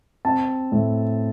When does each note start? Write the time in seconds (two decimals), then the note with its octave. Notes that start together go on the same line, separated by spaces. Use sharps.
0.25 C4 A5
0.72 A2